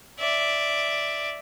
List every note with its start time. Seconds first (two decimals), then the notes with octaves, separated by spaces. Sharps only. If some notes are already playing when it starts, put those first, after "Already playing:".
0.19 D5 E5